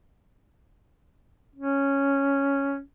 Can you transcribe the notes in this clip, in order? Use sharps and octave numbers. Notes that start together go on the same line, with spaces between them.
C#4